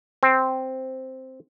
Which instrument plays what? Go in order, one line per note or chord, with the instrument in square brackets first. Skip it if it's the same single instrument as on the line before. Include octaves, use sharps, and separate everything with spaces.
[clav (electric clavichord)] C4